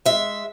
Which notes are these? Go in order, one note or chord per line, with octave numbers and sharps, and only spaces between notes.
G#3 E5